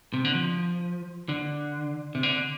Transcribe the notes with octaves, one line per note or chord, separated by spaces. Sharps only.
C3
D3
F3
D3
C3
D3